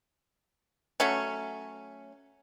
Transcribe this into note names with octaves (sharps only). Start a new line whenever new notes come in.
F#3 A3 C#4